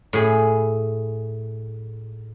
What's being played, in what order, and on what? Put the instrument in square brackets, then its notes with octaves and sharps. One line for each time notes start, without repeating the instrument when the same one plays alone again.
[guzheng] A2 G#4 B5